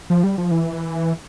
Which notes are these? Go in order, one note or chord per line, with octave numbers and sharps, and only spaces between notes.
F3
G3
F3
E3